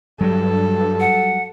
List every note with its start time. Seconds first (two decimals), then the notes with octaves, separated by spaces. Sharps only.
0.21 G2 F#3 G3 A4
1.00 F#5